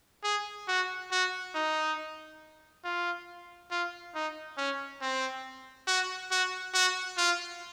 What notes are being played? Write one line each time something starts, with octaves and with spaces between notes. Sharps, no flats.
G#4
F#4
F#4
D#4
F4
F4
D#4
C#4
C4
F#4
F#4
F#4
F4